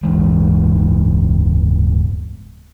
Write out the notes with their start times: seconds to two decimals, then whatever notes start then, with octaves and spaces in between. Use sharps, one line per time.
0.03 D1 G2 E3 G#3